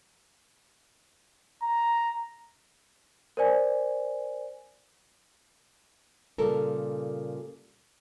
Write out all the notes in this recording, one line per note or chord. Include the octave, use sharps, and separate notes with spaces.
A#5
A#4 C5 D5 G#5
A#2 C#3 G3 A4 A#4